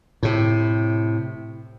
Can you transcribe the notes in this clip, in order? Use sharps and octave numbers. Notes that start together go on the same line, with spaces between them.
A2 C3